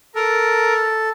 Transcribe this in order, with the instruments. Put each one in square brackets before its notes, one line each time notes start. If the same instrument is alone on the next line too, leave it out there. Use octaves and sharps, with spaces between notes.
[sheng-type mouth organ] A4 [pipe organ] A#4